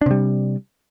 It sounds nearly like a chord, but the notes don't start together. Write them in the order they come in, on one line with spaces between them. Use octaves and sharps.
D4 C3 G3